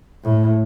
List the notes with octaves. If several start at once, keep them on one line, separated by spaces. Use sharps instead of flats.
A2